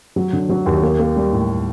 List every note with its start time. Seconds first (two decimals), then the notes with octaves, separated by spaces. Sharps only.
0.16 F#3
0.33 D3
0.49 F#3
0.66 D#2
0.82 A#3
0.99 A#3
1.16 G3
1.33 A2